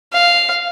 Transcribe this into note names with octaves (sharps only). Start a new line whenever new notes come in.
F5